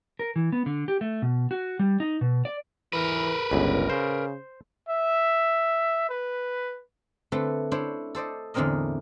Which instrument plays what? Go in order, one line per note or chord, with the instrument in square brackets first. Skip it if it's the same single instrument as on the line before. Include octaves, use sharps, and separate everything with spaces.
[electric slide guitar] A#4
E3
B3
D3
G4
A3
B2
F#4
G3
D#4
B2
D5
[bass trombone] E3 [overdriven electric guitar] A#4 B4
[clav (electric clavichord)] G1 C#2 [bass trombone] C#3
[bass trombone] C#3 [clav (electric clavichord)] C5
[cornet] E5
B4
[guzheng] D3 A3 C4 A4 B4
D4 E4 C5 C#5
A4 C5 D5 D#5
E2 A2 D3 C4 A#4 D#5